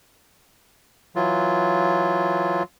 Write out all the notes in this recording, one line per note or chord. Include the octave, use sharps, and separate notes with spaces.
E3 F#3 F4